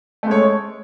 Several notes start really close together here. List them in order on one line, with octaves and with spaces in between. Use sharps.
A3 G#3 C#5